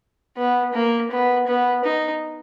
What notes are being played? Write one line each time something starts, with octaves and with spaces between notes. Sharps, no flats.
B3
A#3
B3
B3
D#4